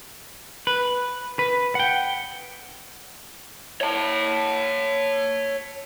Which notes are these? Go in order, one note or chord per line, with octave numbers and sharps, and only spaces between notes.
B4
B4
F#5 G5
C#5 A5